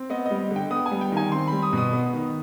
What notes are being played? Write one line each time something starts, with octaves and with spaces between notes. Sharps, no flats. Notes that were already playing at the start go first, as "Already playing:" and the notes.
Already playing: C4
B3 D#5
D#5
G3
D3
G5
B3 D#6
G#5
G3
G5
D#3 G#5
C4 C6
G3 B5
D#6
B2 D#6
B3
D#3